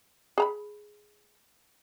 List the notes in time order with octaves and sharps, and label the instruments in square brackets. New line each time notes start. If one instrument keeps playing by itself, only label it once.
[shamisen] G#4 A#5 B5